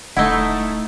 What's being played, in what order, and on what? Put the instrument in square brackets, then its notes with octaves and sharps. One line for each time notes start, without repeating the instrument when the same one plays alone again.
[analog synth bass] D#1 [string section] A3 [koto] D#4 E4 [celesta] F#5 E6 G7